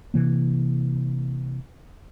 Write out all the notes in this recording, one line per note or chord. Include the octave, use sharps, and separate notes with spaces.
C3 E3 A#3